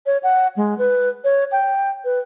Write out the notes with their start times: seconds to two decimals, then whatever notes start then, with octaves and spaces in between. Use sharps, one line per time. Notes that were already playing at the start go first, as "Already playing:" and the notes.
0.06 C#5
0.23 F#5
0.57 G#3
0.78 B4
1.24 C#5
1.52 G5
2.05 B4